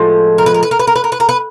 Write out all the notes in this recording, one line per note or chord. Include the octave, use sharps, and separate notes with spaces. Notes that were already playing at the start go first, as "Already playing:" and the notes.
Already playing: A2 F3 G#3
A#4
B4
A#4
B4
A#4
B4
A#4
B4
A#4
B4
A#4
B4